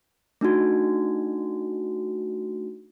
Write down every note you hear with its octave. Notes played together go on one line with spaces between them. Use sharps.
A3 D4 D#4 F#4